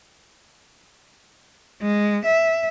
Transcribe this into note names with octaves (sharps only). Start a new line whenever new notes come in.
G#3
E5